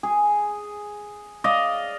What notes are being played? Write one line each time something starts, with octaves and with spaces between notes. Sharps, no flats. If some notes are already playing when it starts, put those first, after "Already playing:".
G#4
D5 D#5 F5